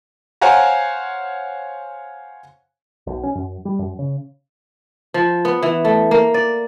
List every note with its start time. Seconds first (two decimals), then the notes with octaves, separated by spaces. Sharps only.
0.41 C5 C#5 F5 F#5 G#5 A#5
3.07 B1
3.23 C#4
3.35 F#2
3.65 G3
3.79 F#2
3.99 C#3
5.14 F3
5.45 B3
5.63 E3
5.85 A3
6.11 A#3
6.34 D5